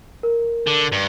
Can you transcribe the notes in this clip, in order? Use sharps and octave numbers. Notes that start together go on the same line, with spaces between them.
A#4
D3
G2